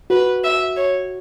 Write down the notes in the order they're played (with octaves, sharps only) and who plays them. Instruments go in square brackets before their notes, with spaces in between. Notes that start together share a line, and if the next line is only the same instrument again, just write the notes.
[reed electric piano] F#4 [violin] B4
[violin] E5
C#5